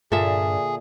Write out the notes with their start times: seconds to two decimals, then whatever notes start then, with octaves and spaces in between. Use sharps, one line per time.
0.12 G2 A#2 D3 G#4 E5